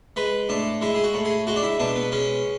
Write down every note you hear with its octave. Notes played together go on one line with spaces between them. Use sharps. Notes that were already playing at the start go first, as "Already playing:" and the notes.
G#3 B4
A2 D4
G#3 E4
G#4
F#4
A2
G#4
G#3 F#4
D4
E4
B2 D4
B3
G#3 C#4